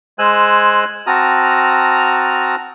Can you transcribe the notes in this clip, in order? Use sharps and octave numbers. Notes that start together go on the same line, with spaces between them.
G#3 C5 G#5 E6 F#6
C4 F#4 A5 A#5 D#6 F6